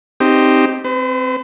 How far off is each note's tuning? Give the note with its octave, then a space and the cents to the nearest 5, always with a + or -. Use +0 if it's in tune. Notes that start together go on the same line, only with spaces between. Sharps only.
C4 +0 D#4 +0 G4 +0
C4 +0 B4 +45